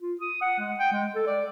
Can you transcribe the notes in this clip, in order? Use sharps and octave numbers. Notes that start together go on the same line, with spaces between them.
F4
D#6
F#5
G#3
G5
G#3
A4
D5